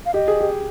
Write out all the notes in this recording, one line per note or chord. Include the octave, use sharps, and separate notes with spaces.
F5
G4 D#5
G#4
G4